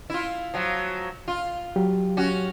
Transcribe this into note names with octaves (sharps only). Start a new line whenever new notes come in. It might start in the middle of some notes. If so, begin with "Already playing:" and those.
E4 F4
F3 F#3
F4
F#3 G4
C#4 F#4